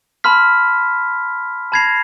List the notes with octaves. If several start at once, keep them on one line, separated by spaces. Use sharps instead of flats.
A5 B5 C6 F6 B6
A5 B5 G#6 A#6 C7 F7